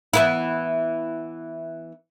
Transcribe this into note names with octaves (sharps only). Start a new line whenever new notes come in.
E3 B3 E4